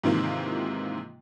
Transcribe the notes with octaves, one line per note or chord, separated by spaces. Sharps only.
G#2 C3 D#3 E3 A#3 F4